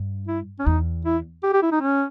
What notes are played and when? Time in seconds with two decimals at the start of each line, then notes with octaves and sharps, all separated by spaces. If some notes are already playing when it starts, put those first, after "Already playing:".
Already playing: G2
0.28 E4
0.59 C#4
0.66 E2 D#4
1.05 E4
1.43 G4
1.53 G4
1.63 E4
1.72 D#4
1.82 C#4